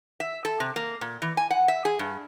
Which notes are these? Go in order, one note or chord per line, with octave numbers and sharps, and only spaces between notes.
E5
A4
C3
A#3
A#2
E3
G#5
F#5
E5
G#4
G2